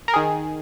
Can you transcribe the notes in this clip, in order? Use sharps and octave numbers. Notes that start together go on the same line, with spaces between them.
A#4
D#3 G#4